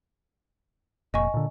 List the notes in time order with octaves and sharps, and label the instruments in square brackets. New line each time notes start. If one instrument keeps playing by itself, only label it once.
[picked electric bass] F1 A#2 [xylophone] D#5 G#5 C#6
[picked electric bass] A#2 D3